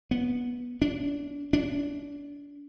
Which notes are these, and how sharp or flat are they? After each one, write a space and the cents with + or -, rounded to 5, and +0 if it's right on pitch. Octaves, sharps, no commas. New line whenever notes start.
B3 -15
D4 -35
D4 -35